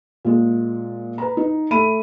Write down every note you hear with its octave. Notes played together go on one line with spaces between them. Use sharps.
A#2 G#3
B4 A#5
D#4
A3 E5 B5 D#7